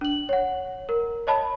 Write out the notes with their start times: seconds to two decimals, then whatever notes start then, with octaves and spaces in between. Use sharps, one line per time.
0.01 D4 F#7
0.29 C#5 F#5
0.89 A#4
1.27 C#5 D#5 A5 B5